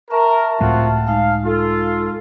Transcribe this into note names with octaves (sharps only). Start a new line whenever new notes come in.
A#4 E5 A5 C#6
C#2 A2 A3 C4 F4 F#4
G#3 D#4 F5
F4 A4